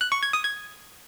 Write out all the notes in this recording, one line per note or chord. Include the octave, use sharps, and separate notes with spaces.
F#6
C#6
G#6
D#6
G#6